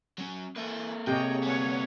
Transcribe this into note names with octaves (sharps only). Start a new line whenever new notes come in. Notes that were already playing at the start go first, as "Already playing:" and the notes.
F#3 C#4
A#3 A4 B4 E5
C3 G#4 C#5 D#5 G5
G3 B3 C#5 F#5